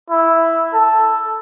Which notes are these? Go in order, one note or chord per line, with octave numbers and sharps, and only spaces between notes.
E4
A4